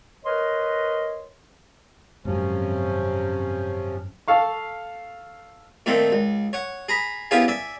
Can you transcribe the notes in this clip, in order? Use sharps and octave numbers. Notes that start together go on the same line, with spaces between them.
A#4 B4 C#5 D#5 C6
G#1 F#2 C3 F3 C#4
A4 F5 C#6
A#2 D#3 A3 C4
C#2
C#5 F#5
G#4 A#5 B5
B3 C#4 E4 F4 G4 G#4
D5 E5 G#5